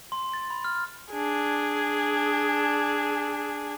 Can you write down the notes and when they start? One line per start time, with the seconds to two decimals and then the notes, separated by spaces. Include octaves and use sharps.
0.12 C6
0.34 A6
0.50 B5
0.64 F6
1.13 D4 G#4